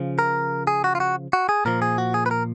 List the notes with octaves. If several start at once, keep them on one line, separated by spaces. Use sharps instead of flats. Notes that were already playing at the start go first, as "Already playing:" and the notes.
Already playing: C#3 F3
A#4
G#4
F#4
F4
F#4
F#4
G#4
A#2 F3 A#4
G#4
F#4
G#4
B4
A#4